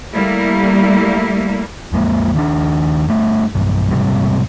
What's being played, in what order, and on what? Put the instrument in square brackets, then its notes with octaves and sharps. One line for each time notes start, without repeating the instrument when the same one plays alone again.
[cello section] G3 A3 A#3 E4
[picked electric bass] F2 G#3 A#3
D#2 D#3 C#4 D4
G2 A3
B1 G2
E1 G#2 C3 G3